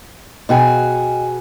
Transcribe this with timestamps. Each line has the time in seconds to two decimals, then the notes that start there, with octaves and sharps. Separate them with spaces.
0.49 B2 F#4 G#4 D#5 G5 G#5